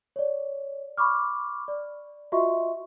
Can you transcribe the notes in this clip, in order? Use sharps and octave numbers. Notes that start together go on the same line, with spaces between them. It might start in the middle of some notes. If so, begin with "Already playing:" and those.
C#5 D5
B5 C#6 D6 F6
D5
F4 F#4 D#5 E5 C6 C#6